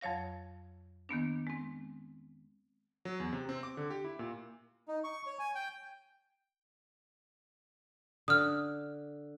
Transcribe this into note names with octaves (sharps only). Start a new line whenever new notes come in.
F2 F#3 C#5 F5 A#6
D#3 A#3 B3 D4
G#3 C4
F#3
E2
C3
C4
D6
D3
G4
E4
A#2
D#4
C#6
C#5
G#5
G5
D3 D#6 F6